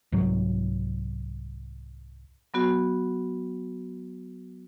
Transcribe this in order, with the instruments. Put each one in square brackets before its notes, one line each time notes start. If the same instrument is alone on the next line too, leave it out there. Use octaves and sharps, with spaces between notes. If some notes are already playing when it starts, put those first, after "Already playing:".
[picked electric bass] C2 G#2 F#3
[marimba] F#3 B3 F#4